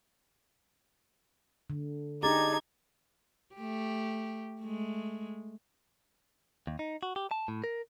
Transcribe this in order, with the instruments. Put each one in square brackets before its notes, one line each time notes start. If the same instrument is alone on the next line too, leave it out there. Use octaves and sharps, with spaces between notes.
[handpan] D3
[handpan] D4 G4 G#4 [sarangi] D#4 [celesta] A#5 D6 A6 [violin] G#6
[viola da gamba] A3 G4
G#3 A3
[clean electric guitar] D#2
D#4
F#4
G4
A5
A2
A#4